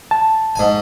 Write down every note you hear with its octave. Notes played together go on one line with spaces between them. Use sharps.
A5
G#2 G#5